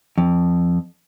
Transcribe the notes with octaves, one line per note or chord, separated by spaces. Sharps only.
F2